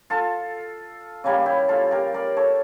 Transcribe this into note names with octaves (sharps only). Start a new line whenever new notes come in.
F4 A4
C#3 G3 A#3
E4 G4
F4 A4
G4 A#4
A#4 D5
A4 C#5